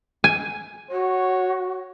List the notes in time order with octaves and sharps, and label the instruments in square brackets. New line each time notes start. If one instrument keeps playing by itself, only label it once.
[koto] G#5
[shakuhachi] F#4 [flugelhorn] C#5